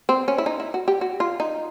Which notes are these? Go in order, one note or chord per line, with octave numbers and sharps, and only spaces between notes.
C4
C#4
E4
D#4
E4
F#4
G4
F#4
F4
D#4